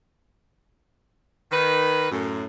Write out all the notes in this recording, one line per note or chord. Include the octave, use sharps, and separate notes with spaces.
D#3 B4
F#2 A2